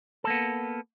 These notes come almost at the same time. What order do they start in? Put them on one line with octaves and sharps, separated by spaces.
A4 A#3 B3